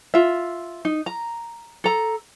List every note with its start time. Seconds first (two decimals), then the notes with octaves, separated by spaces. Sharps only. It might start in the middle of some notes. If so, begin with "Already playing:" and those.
0.14 F4 E5
0.85 D#4
1.06 A#5
1.84 A4 A#5